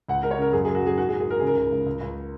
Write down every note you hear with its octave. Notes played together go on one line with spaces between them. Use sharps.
C#2 F#5
G#3 A#4
C#5
C#3 A#4
F#2 G#4
G#4
F#3
F#4
F#3 G#4
G#2 F#4
G#4
G#2
G#4
G#2 A#4
C#3 G#4
A#4
C#2
C#2
C#2
C#2